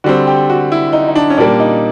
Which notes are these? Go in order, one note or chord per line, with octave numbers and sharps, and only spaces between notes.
D3 G3 C4 F#4
G4
F#4
E4
D#4
D#4
D4
C#4
A#2 G3 A#3 D4
D#4